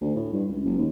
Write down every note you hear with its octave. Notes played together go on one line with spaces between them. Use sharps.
D2
A2
G2
C#2
F#1
D#2